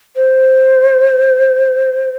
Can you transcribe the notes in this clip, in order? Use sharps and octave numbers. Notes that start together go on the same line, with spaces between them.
C5